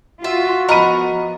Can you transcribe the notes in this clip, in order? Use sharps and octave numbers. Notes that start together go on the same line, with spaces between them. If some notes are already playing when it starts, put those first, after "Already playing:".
F4 F#4 E5
F3 B3 A#4 D#5 F#5 B5 D#7